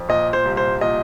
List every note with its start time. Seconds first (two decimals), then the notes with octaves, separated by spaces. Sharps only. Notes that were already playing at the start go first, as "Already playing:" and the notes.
Already playing: F2
0.09 A#2 D#5
0.33 C5
0.45 C2
0.57 C5
0.81 A#2 D#5